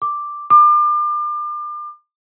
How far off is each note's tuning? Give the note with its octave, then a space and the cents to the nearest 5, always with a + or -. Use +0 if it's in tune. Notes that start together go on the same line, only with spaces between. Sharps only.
D6 +5
D6 +35